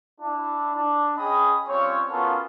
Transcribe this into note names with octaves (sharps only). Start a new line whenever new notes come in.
D4 E4
D4
C#4 G#4 D#5 G5 B5 D#6
G3 C4 C#4 F4 C#5
B3 C#4 F4 F#4 A4 A#4